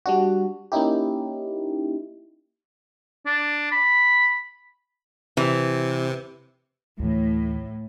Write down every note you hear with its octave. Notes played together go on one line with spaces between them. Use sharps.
G3 D4 F#4
A#3 C#4 D#4 E4 G4
D4
B5
C3 E3
D2 A2 E3